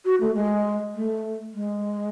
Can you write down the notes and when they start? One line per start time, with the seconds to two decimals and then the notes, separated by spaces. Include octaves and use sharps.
0.05 F#4
0.20 A3
0.34 G#3
0.93 A3
1.53 G#3